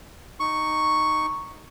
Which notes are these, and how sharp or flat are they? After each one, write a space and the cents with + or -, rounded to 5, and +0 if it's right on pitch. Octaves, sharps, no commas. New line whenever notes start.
D#4 -10 C#6 +0